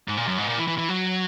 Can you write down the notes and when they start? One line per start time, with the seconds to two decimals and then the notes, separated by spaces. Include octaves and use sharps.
0.08 G#2
0.17 A#2
0.27 F#2
0.38 G#2
0.48 A#2
0.57 E3
0.68 E3
0.78 E3
0.89 F#3